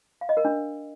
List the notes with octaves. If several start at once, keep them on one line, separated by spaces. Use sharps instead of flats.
F5
D#5
A#4
D4